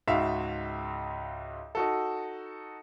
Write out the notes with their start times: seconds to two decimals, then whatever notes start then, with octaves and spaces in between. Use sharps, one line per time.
0.08 C#2 G#2 F#4 E5 F5
1.75 D#4 F#4 A4